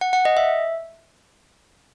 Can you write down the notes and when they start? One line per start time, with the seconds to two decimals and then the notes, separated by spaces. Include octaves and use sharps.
0.01 F#5
0.13 F#5
0.25 D#5
0.37 E5